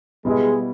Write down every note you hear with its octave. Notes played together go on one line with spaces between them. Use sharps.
B2 G3 G#3 B3 E4